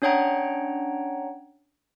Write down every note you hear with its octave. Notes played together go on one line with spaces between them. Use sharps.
C#4 D4 C#5 F#5 G5 A#5